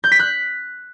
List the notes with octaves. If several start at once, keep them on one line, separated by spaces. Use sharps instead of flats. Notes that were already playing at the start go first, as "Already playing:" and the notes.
G6
B6
F#6